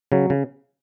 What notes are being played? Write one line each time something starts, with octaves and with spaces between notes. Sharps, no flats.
C#3 F#3
C#3